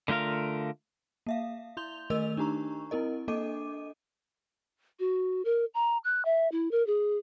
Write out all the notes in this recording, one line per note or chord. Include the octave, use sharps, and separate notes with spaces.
D3 A3 F4 A#4 F5
A#3 E5 F5
E4 C6 G6 F7 G7
D#3 A3 A#4 D#5 E6 F7
D4 D#4 G4 A#5 C#6
C4 E4 A#4 D#5
A#3 D4 A4 D#5 D6 D#7
F#4
A#4
A#5
F#6
E5
E4
A#4
G#4